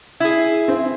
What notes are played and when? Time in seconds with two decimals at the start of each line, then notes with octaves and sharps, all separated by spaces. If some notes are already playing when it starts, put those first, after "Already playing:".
0.20 E4 G#4
0.68 C4 E5